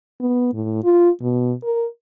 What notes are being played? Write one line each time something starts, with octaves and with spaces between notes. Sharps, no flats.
B3
A2
F4
B2
A#4